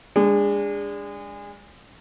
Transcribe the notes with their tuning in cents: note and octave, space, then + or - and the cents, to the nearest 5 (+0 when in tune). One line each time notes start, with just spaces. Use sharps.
G#3 -25 D4 -5